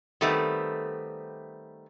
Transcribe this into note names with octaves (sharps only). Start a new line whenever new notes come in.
D#3 G3 A3 B3 C4